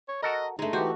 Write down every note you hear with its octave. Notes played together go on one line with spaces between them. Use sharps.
C#5
F#4 A4 A#4 D#5
G2 G#3 A3 D#4
E3 F#4 G4 C5